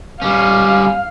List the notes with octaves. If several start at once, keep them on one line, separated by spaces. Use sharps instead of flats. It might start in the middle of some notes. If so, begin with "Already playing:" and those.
G3 C#4 F5